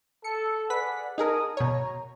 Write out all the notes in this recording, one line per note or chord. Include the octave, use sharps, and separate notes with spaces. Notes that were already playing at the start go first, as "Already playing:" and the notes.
A4 C#7
G#4 B4 D5 F#5 B6
D#4 G#4 A#4 A5 D#6
B2 C#5 A#5